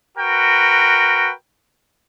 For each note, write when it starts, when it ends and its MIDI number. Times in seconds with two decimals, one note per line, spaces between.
0.18 1.32 66
0.18 1.32 70
0.18 1.32 71
0.18 1.32 79